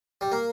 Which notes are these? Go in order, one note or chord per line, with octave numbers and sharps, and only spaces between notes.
G3
A#3